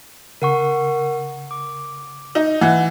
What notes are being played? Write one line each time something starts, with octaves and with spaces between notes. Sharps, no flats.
C#3 A#4 F#5 C#6
D6
D#4
E3 F#5